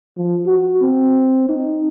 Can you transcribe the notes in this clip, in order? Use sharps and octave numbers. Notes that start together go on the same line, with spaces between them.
F3
F#4
C4
D#4